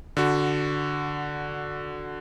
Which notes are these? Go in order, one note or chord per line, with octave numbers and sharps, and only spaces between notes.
D3 F#4